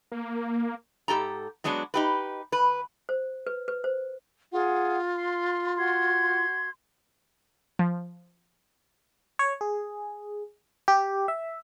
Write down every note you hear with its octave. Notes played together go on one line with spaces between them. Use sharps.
A#3
G#2 G4 A4 A#5
F#3 G#3 B3 D4 F#4
D#4 G4 B4
B4
C5
B4
B4
C5
F4 G#4 F#5
C6
F#4 C6 G#6
F3
C#5
G#4
G4
E5